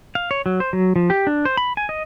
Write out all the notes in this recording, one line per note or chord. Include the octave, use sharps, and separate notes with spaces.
F5
C#5
F#3
C5
F#3
F3
G4
D4
C5
B5
G#5
D#5